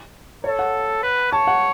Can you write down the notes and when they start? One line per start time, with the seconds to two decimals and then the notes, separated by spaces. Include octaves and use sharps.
0.44 A4 C#5
0.59 F#5
1.03 B4
1.32 C#5 A5
1.47 F#5